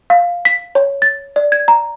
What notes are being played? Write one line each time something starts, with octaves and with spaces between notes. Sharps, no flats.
F5
B6
C#5
A6
D5
G#6
A#5